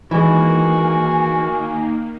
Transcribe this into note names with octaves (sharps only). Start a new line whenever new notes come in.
D#3 E3 G#3 A#3 F#4 G#5